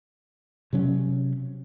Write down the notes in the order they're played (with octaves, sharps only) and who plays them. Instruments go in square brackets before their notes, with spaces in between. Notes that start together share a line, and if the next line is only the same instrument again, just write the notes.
[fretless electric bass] C3 F#3 C#4